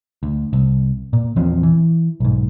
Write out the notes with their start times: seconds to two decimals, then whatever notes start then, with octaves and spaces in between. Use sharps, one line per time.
0.23 D2
0.53 C2
1.13 A#2
1.36 A#1 E2 F3 C4
1.63 E3
2.20 B1 G#2